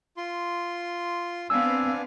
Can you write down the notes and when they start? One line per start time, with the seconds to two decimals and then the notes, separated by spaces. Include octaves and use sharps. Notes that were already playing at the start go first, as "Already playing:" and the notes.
0.17 F4 C6
1.50 B3 C4 D4 F5 G#5 E6